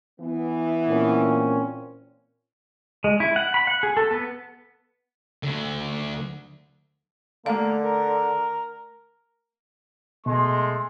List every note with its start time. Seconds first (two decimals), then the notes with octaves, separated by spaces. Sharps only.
0.21 E3 B3
0.88 A#2 C4 C#4
3.04 G#3
3.20 E4
3.36 F#5
3.54 B5
3.67 F#5
3.83 G#4
3.97 A4
4.11 B3
5.43 D2 D3
7.46 D3 A3 A#3 F5
7.83 A#4
10.26 B2 G#3 A3 C6